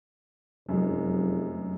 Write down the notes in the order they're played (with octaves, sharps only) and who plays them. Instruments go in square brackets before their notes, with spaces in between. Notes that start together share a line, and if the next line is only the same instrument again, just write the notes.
[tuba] F1 [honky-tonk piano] F#2 G#3